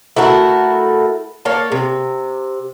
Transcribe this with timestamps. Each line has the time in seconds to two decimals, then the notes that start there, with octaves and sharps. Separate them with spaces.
0.16 A3 E4 F#4 A#4
1.45 A#3 C#5 A5
1.72 C3